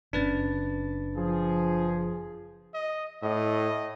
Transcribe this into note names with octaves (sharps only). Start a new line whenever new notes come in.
F#1 B2 C#4 D4 B4 A6
F3 G#4
D#5
A2 D#5